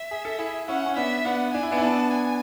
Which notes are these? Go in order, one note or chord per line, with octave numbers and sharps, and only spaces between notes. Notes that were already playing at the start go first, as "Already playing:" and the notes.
Already playing: E5
G#4
A4
E4 G#4
C#4 E4 F#5
C#4
B3 D4 E5
B3 D4 F#5
D4 G#5
E4
B3 D4
E4
B3 D4 A5
G#5